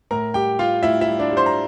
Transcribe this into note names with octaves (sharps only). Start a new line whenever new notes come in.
A2 A#4 A#5
G3 G4 G5
G3 F4 F5
A2 E4 E5
E4 E5
G3
D4 D5
G3
C5 C6
A#5